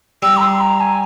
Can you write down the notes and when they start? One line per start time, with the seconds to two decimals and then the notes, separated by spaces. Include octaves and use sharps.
0.22 G3 E6
0.37 A#5
0.41 C6
0.60 A#5
0.80 G#5